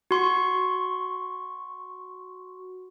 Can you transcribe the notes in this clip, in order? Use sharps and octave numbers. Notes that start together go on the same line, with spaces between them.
F#4 C6 C#6